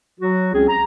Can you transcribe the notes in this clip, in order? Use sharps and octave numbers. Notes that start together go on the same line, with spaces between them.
F#3 F#4
C#2 C4 C#4 G#4
A#5